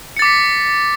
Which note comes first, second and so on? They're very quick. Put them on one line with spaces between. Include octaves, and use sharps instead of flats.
C#7 A6 D6 B6